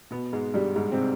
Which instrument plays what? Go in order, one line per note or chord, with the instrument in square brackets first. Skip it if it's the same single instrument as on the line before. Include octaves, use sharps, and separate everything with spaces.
[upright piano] B2 B3
G#2 G#3
G2 G3
G#2 G#3
C3 C4